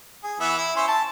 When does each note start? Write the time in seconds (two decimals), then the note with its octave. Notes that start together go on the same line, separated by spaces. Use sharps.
0.24 G#4
0.40 E3 B3 E5
0.57 E4
0.76 C#4 C5 E5
0.88 A5